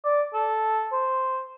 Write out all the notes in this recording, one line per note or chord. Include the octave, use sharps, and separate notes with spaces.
D5
A4
C5